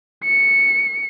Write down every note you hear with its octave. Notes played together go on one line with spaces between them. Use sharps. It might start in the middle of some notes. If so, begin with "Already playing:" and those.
C#7